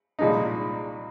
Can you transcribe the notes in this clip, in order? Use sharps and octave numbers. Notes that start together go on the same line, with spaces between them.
C2 A#2 F3 G#3 D#4